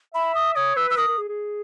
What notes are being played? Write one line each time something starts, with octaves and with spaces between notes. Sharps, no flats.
E5 B5
D#6
C#5 D#6
B4 E6
E6
A#4 D#6
A#4
G#4
G#4